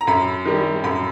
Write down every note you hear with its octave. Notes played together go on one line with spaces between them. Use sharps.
A#5
F#2 B5
D#3 G3
F#2 B5